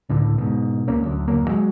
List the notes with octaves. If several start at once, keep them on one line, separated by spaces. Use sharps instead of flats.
C#2 A2 D3
G#2 B2
C#2 A#3 C#4
D2 F#3
F#1 D2 F#3 A#3
F#3 G#3